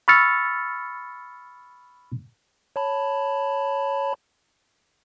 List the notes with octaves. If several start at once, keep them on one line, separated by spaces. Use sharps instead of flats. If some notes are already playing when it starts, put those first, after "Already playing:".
B5 C#6 E6 F6 A6 C#7
C#5 A5 B5